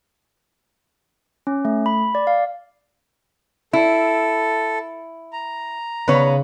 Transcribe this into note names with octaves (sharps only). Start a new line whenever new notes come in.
C#4
A3
B5
D5
F5
E4 A4
A#5
C#3 B3 B4 C#5